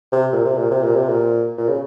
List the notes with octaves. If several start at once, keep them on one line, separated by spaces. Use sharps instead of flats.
C3
A#2
C3
A#2
C3
A#2
C3
A#2
A#2
C#3